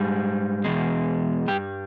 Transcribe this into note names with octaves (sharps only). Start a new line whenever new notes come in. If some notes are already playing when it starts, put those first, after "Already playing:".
Already playing: G#2 G3
E2 B2 G#3
G2 G3 G4